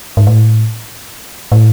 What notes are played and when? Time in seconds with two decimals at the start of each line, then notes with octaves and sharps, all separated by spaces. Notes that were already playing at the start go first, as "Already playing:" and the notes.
0.17 G#2
0.27 A2
1.52 A2